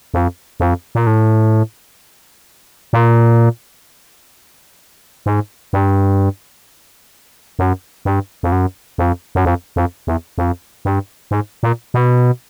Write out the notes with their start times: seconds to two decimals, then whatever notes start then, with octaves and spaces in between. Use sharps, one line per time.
0.14 F2
0.60 F2
0.95 A#2
1.07 A2
2.93 A#2
5.26 G#2
5.73 G2
7.59 F#2
8.05 G2
8.43 F2
8.52 F#2
8.98 F2
9.35 F#2
9.45 F2
9.76 F2
10.07 E2
10.38 F2
10.85 G2
11.31 G#2
11.63 A#2
11.94 B2